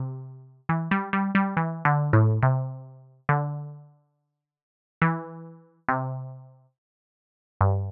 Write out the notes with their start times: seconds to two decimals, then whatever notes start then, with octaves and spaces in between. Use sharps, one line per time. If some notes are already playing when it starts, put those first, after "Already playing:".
Already playing: C3
0.69 E3
0.91 G3
1.13 G3
1.35 G3
1.57 E3
1.85 D3
2.13 A2
2.43 C3
3.29 D3
5.02 E3
5.88 C3
7.61 G2